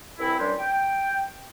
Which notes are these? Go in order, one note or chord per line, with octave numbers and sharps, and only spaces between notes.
C2 E3 C4 E4
F#2 E3 G3 D4 G4 C6
G5